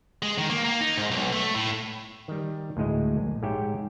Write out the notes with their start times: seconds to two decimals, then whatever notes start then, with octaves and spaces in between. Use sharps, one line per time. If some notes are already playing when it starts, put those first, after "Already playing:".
0.23 G#3
0.38 D#3
0.50 A#3
0.65 A#3
0.81 D#4
0.97 G#2
1.11 B1
1.32 A3
1.54 A2
2.28 D#3 G3
2.77 D2 A2 G#3 D#5
3.17 A#1
3.43 G#2 G4 C#5 E5 G5